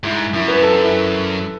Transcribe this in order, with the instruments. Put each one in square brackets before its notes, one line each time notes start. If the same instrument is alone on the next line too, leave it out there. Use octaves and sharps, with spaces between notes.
[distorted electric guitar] G#2 [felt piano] E4
[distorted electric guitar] F#2 [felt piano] E4
[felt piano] B4
A4
E4